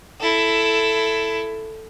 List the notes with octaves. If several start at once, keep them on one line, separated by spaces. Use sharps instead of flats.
E4 A4